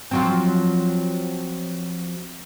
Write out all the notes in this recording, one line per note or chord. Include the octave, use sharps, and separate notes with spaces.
F3 F#3 C4